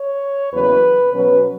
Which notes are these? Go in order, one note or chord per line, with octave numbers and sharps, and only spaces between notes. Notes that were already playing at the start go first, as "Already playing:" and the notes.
Already playing: C#5
E2 C#3 F#3 A#3 B4
B2 F#3 C#4 B4